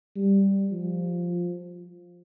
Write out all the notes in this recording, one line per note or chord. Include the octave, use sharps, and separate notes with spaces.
G3
F3